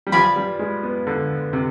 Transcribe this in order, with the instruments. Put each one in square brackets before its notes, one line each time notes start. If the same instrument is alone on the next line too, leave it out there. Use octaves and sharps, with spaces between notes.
[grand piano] G3
[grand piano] F3 [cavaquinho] B4 D5 G#5 B5
[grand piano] G3
G#3
B3
D3
C3